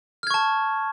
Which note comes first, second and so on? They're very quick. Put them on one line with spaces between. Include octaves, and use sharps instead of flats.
F6 G#6 C#6 A5